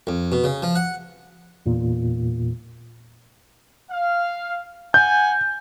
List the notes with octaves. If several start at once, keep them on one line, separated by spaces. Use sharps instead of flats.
F2
B2
C#3
F3
F#5
E2 A#2
F5
F#5 G#5 G6